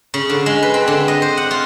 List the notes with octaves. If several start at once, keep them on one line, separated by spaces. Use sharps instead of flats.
C#3
D3
G#3
B4
C4
D3
D#5
C5
F#5
F4